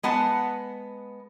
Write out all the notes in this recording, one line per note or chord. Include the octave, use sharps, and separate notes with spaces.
G#3 B3 F#5 A5